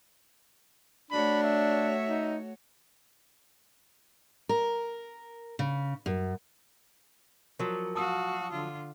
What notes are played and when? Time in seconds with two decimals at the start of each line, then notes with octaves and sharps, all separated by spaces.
1.11 A3 D4 F#4 C#5 B5
1.43 E5
2.07 D#4
4.49 A#4
5.59 C#3
6.06 F#2
7.59 F3 F#3 A#4 C#6
7.95 F#4 F5 A5 D#6 E6
8.52 D3 F4